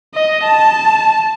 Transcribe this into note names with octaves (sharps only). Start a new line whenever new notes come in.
D#5
A5